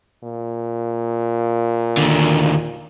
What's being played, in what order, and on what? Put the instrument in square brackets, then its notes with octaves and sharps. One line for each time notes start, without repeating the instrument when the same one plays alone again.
[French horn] A#2
[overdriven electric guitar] D#2 D3